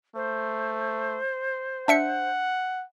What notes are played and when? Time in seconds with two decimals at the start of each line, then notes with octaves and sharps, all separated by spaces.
0.15 A3 C5
1.88 D4 E5 F#5 C#7